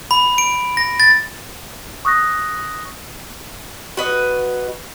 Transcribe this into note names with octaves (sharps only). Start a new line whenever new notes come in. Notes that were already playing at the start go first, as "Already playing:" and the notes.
B5
D7
A#6
A6
C#6 D#6 F#6 A#6
F#4 B4 D#5